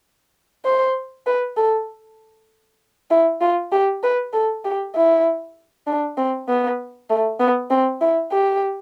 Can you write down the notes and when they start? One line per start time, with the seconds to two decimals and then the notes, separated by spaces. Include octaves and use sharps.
0.65 C5
1.27 B4
1.57 A4
3.10 E4
3.41 F4
3.72 G4
4.03 B4
4.33 A4
4.64 G4
4.95 E4
5.87 D4
6.18 C4
6.48 B3
7.10 A3
7.40 B3
7.70 C4
8.01 E4
8.32 G4